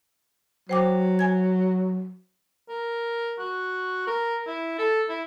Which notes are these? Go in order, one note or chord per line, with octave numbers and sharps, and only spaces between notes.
F#3 C5 G5 D6
G#5 G#6
A#4
F#4
A#4
E4
A4
E4